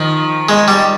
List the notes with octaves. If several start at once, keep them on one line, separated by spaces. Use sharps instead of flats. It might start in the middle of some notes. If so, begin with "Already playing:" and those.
Already playing: D#3 F3
G#3
G3